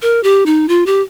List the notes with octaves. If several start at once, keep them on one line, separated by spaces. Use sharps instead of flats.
A#4
G4
D#4
F4
G4